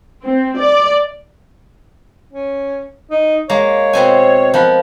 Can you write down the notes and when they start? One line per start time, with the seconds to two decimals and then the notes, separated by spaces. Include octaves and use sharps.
0.23 C4
0.58 D5
2.33 C#4
3.11 D#4
3.50 G#3 A#3 C#5
3.93 B2 C4 G#5
4.54 F3 B3 A#4 B4